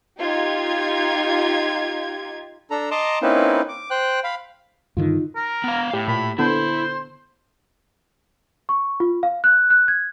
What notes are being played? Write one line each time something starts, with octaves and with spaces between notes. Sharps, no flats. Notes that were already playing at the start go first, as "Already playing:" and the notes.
D#4 F4 G4 G#6
D4 A4 A#5
D#5 A5 A#5 C6 D6
A#3 C4 C#4 D#4 E4 B4
D6
C5 G5 F#6
F5 B5
G2 D3 D#3 D#4 F4
A#4
B3 F5
A2 G4
A#2 B5
D3 B3 E4 A4 C5
C#6
F4
F5
F#6
F#6
G#6